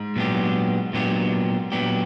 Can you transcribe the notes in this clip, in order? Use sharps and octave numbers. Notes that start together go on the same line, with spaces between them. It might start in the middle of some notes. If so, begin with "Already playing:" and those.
Already playing: G#2
A#2 F#3 B3 D4 G4
A#2 F#3 B3 D4 G4
A#2 F#3 B3 D4 G4